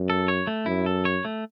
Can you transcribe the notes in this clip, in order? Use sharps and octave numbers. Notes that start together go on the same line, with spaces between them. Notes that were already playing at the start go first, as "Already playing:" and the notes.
Already playing: F#2
A4
C#5
A3
F#2 E4
A4
C#5
A3